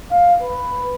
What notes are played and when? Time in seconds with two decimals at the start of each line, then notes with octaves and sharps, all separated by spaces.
0.11 F5
0.42 B4